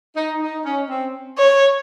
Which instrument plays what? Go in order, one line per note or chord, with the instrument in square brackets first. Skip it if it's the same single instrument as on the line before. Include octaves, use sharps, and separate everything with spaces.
[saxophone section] D#4
D#4
C#4
C4
[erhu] C#5